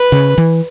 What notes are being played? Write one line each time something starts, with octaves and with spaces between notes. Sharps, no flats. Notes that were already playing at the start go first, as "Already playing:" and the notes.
Already playing: B4
C#3
E3